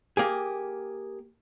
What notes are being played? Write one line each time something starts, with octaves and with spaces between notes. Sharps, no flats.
A#3 G4 G#4